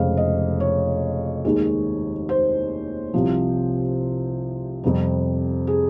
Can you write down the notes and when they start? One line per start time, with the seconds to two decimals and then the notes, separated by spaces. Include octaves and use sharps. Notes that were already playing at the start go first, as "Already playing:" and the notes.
Already playing: F1 F2 C#3 G#3 F5
0.17 D#5
0.60 C#5
1.45 D#2 D#3 G#3
2.29 C5
3.14 C2 C3 F3
4.84 F2 C3 G3
5.67 G#4